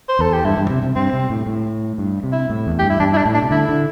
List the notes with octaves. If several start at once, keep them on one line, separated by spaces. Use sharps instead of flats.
C5
E2 A4
G4
G2 E4
G2
C3
C3
G2 C4
C3
A2
A2
G2
C3
E4
A2
E2
G2 G4
E4
G2 D4
E4
D4
A2
D4
C3
D3 E4
D3